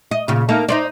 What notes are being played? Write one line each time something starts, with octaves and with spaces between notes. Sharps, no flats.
D#5
A#2 C#3
A#3 D#4 A4
D#4 C5 D5